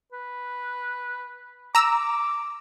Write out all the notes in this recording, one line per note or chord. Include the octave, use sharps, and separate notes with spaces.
B4
A#5 D6 E6